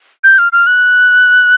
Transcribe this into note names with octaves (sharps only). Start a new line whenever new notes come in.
G6
F6
F6
F#6